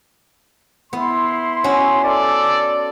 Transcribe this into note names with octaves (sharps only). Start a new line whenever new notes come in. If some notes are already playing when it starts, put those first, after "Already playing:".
B3 E4 C6
C#4 F#4
A4 D5